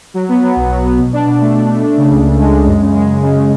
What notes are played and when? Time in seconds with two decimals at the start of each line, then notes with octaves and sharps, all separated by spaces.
0.14 F#3
0.29 B3
0.43 F#3
0.56 B1
0.70 F#3
0.85 B3
0.98 B2
1.13 D4
1.26 B2
1.41 A3
1.54 D4
1.68 A3
1.83 D4
1.97 C#3
2.11 C#2
2.25 C#3
2.39 G#3
2.52 G#3
2.66 F#2
2.81 C#3
2.95 G#3
3.09 F#2
3.22 C#3
3.37 C#3